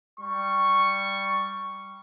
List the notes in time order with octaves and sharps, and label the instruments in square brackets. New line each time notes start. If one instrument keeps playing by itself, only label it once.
[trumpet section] G3 C#6